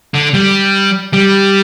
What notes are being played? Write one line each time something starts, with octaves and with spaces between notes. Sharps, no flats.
D3
G3
G3